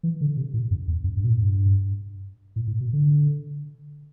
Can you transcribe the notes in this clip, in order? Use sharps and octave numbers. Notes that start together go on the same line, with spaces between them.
E3
D3
C3
A2
F#2
E2
F#2
G2
B2
A2
G2
A2
A2
B2
D3